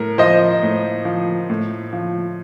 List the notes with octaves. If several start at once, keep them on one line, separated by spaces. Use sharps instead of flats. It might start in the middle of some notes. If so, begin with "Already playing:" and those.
Already playing: A2 A#4
F3 C5 D#5
A2
F3
A2
F3